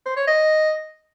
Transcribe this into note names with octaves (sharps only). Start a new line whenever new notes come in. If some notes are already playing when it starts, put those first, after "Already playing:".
C5
C#5
D#5